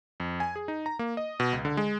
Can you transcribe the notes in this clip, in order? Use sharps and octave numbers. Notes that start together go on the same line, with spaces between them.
F2
G#5
G#4
D#4
A#5
A#3
D#5
B2
C#2
D3
G#3